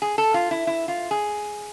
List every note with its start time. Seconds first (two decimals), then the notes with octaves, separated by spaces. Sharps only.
0.02 G#4
0.18 A4
0.34 F4
0.51 E4
0.67 E4
0.88 F4
1.11 G#4